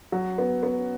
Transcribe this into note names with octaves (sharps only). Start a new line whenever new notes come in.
F#3
B3
B3